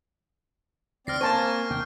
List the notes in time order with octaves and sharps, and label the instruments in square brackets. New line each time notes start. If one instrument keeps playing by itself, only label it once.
[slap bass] C#2 [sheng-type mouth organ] C4 D5 [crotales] F6 A#6 C7
[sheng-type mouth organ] A#3 G#5 [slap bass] C4 [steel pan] C5 A5 [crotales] C#6
[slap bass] D#2 C3 B3 [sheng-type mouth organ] G5